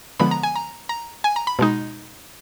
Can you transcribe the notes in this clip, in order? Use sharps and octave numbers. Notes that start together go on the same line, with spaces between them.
D3 F3 G#3 B3 B5
A#5
G#5
A#5
A#5
G#5
A#5
B5
B2 G#3 D#4